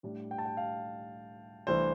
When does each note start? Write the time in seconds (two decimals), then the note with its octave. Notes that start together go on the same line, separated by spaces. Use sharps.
0.03 A2 G3 D4
0.31 G5
0.38 A5
0.46 G5
0.57 F5
1.67 C2 C3 E3 A3 D4 C5